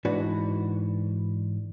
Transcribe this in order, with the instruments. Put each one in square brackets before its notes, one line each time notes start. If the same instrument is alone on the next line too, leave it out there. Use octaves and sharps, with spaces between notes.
[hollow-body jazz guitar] G#2 E3 D4 F#4 B4